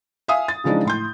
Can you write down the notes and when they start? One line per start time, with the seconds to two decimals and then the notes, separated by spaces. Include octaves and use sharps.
0.28 E5 F5 G#5 D#6
0.48 A6
0.64 C#3 E3 F3 G#3 D4 D#4
0.85 A2 C6 G6